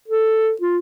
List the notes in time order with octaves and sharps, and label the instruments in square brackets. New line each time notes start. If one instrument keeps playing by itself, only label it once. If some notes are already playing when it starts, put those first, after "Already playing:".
[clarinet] A4
F4